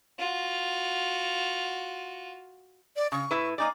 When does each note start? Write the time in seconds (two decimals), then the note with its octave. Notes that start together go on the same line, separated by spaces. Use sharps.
0.19 F4 F#4
2.96 D5
3.12 C#3 C#6
3.31 A2 E4 B4
3.58 A#3 D#4 D5 G#5